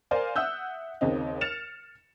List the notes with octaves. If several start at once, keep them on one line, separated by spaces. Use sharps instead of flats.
A#4 C5 D5 F5 G#5
E5 F#5 D#6 E6 F#6 G6
D#2 C#3 C4 D#4
F6 A6 C#7 E7 F7